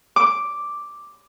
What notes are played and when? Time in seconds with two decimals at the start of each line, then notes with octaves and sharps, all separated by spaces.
0.16 D6